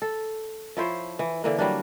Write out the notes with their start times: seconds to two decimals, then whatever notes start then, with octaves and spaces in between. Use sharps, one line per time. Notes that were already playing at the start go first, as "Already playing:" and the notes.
0.02 A4
0.77 F3 E4 C5 C#5
1.19 E3
1.44 D3 E3 A#3
1.58 F#3 G3 A#3 D4